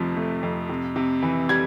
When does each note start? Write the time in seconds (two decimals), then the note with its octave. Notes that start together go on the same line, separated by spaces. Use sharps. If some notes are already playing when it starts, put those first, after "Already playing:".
Already playing: F2 C3 F3 A3
0.17 A3
0.43 F2
0.69 C3
0.96 C3
1.23 E3
1.49 G3 G#6